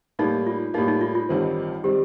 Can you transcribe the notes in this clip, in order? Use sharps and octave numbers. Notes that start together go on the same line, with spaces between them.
A2 G3 A#3 D#4
F4
A2 G3 A#3 D#4
D#4
F4
F4
A1 G2 D#3 G3 C4
D#3 G3 C4 G4